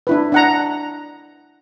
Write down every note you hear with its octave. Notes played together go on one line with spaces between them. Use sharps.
D4 E4 B4
D4 F#5 A#5